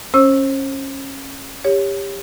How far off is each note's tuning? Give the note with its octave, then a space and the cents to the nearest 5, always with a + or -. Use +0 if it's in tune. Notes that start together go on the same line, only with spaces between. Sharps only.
C#4 -20 C5 +35 E6 +0
G4 +20 C#5 +5